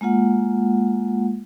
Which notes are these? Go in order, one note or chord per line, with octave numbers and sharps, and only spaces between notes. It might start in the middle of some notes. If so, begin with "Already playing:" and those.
G#3 A#3 F4 F#5